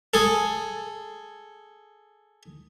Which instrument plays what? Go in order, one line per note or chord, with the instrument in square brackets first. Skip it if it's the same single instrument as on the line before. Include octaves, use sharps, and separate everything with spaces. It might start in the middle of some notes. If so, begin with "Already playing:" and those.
[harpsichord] G#4 A4